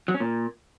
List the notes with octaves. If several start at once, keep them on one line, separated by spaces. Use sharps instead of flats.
F#3
C#4
A#2